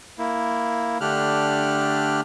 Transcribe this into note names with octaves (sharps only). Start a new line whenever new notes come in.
A#3 E4
D3 A3 D4 G4 F6 F#6